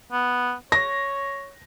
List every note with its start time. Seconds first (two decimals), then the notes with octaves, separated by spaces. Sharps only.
0.12 B3
0.72 C#5 A#6